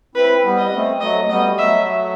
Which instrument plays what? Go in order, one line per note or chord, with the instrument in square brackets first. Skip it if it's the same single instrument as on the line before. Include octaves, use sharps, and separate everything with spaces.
[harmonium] C4 E4 [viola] B4
[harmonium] G3 B3
[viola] D#5
[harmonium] A3 C4
[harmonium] F#3 A3 [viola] D#5
[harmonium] G3 B3 [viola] D#5
[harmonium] F#3 A3 [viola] E5